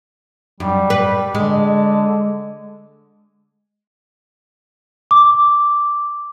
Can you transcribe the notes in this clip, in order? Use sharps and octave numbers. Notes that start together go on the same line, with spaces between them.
F#2 G3
B4
D3 G#3
D6